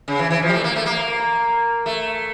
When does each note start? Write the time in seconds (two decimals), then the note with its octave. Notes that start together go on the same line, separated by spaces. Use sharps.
0.08 C#3
0.19 E3
0.30 E3
0.42 F3
0.49 G3
0.53 A3
0.64 A#3
0.76 A3
0.86 A#3
1.86 A3